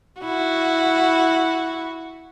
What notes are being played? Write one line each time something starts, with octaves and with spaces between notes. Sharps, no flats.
E4 F#4